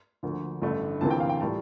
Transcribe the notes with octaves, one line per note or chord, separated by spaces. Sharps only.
D2 D3 F3 A#3
A1 G2 D3 A3
D2 C3 E3 A#3 A5
G5
F5
G5
A2 G3 A#3 A5